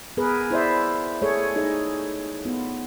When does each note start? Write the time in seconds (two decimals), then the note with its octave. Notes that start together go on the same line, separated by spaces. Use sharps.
0.17 B3 G#4 A#4 B4
0.51 E4 C5 D5 E5
1.22 A3 G#4 A4 C#5
1.56 D#4 G#4 D#5
2.45 B3 F4